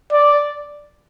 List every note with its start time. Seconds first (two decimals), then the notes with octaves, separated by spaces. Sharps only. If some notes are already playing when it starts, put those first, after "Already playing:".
0.12 D5